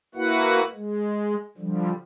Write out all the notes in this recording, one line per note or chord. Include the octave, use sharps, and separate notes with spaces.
A#3 E4 F#4 B4 F#5
G#3
D3 F3 G3